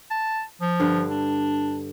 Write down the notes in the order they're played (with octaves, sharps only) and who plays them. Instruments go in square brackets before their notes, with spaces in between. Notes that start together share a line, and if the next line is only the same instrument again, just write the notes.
[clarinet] A5
F3
[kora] G2 D3
[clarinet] D4